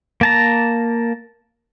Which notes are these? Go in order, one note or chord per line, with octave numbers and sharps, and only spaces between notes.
A#3 A5 A#5